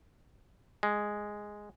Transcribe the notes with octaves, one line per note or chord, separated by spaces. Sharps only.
G#3